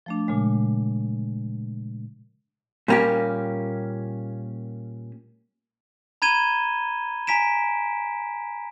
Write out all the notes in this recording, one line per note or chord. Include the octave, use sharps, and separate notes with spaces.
F3 A3 D4
A#2 C#3 G#3
A#2 G3 A#3 C#4 G4
A#5 B5 G#6 D#7 E7 G7
G#5 A#5 B6 D7 E7